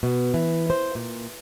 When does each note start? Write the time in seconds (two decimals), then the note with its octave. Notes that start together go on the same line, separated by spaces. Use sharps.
0.03 B2
0.34 E3
0.70 C5
0.95 A#2